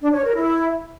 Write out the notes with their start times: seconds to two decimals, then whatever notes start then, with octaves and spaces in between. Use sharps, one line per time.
0.01 D4
0.12 C#5
0.24 A#4
0.35 E4